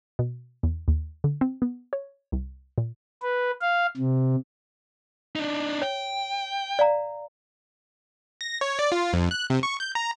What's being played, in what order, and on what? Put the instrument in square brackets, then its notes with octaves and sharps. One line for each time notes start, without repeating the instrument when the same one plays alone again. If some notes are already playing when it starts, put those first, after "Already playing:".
[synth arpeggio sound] B2
E2
D#2
D3
C4
B3
C#5
C2
A#2
[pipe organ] B4
F5
C3
[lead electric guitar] D4 D#4
[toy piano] C#5 [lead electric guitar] G5
[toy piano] D5 F5 A#5
[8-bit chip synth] A#6
C#5
D5
F4
F2
F#6
C3
C#6
G6
A#5